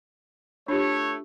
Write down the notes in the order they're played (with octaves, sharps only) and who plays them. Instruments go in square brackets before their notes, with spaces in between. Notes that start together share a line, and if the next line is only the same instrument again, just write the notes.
[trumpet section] A3 C#5 [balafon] D4 F4 G4